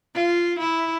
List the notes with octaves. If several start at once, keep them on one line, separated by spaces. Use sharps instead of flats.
F4
E4